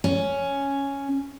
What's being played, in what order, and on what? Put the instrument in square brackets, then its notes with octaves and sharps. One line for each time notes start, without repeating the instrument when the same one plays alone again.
[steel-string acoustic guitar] C#4